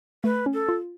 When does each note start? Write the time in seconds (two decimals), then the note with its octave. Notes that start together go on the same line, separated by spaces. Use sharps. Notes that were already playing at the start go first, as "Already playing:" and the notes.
0.24 A3 B4
0.46 C#4
0.54 A4
0.69 F4